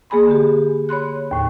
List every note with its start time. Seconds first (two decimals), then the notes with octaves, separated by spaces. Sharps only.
0.10 A#3 G#4 G#5 B5 C6
0.27 D3 G4
0.89 C#5 B5 C6 F#6
1.31 D#2 A2